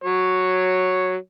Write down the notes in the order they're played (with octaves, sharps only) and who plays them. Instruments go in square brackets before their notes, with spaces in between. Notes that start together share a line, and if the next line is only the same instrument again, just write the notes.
[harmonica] F#3 C#5